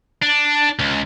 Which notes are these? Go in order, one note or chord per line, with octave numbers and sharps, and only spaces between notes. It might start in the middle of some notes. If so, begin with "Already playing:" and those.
D4
C#2